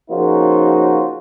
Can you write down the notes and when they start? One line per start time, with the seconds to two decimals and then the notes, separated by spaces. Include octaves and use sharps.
0.10 C#3 F3 A#3 D#4 F4 F#4